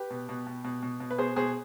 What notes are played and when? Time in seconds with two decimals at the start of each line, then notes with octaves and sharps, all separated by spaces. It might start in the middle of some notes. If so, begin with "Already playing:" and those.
Already playing: G4 B4
0.10 B2
0.29 B2
0.47 B2
0.64 B2
0.82 B2
1.00 B2
1.11 B4
1.18 B2 G#4 C5
1.36 B2 G#4 C5